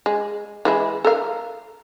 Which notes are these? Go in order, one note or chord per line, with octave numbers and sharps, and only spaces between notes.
G#3
E3 G#3 E4
A4 A#4 F5